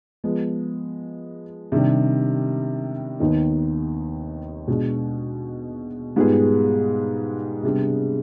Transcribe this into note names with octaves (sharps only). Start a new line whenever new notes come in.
F3 G#3 B3
C3 D#3 G3 D4
D#2 D#3 B3 D#4
B2 G#3 D4
G#2 G3 B3 F4 G#4
C3 G3 B3 D4 G#4